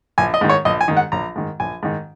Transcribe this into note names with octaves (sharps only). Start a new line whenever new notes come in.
A#1 G#5
D#5
G#2 D#3
C#5
A#1 D#5
G#5
G#2 D#3
F#5
A#1 A#5
G#2 D#3
A#1 G#5
G#2 D#3